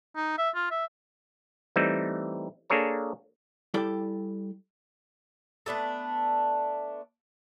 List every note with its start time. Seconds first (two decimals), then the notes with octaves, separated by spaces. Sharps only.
0.16 D#4
0.38 E5
0.55 F4
0.71 E5
1.76 E3 G3 A3 C4 D#4
2.70 A#3 D4 G#4 A4 C#5 A#5
3.74 G3 E4 A4 D5 G5
5.66 A3 B3 D4 A4